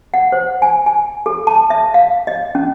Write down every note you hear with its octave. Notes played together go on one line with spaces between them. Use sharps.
F#5
C5
G#5
G#5
A4
A5
E5
F5
D#5
C#4